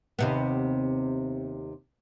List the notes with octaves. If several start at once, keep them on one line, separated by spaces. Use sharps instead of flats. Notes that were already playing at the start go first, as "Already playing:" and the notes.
D#2 C3 B3